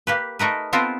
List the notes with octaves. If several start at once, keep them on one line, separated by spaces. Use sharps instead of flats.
A#3 G4 B4
A3 D#4 A#4 B4
B3 C4 F4 A4 A#4